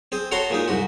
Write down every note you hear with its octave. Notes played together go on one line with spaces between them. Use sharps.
C4 G#4
F#4 A4 C#5 A5 A#5 C6
A#2 G#3 D#4
C2 G#2 F#4